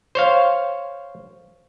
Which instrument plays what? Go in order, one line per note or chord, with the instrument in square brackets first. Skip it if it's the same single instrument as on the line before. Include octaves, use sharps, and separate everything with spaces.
[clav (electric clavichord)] C5 C#5 F5